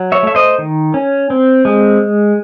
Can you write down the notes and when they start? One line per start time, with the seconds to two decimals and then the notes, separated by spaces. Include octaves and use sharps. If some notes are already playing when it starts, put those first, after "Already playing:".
Already playing: F#3
0.12 C#5 E5
0.23 A3 E5
0.35 C5 D#5
0.58 D#3
0.94 C#4
1.30 C4
1.65 G#3